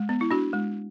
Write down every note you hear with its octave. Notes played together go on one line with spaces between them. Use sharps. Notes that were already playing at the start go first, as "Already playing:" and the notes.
Already playing: G#3
B3
E4
D4 F#4
G#3